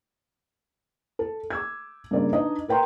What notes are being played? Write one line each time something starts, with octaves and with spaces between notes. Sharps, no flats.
A4
D6 E6 G#6
G2 C#3 A#3 D5
D4 D#4 B4 D#5
A#4 B4 G5 A#5 C6